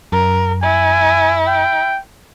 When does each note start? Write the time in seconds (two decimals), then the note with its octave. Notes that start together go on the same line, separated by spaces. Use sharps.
0.12 F#2 A#4
0.63 E4 G#5
1.47 G5